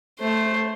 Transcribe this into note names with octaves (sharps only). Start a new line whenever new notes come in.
A3 C5